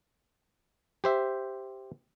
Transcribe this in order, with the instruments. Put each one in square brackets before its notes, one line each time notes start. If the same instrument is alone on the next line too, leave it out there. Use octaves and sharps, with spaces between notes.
[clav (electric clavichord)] G4 C5 E5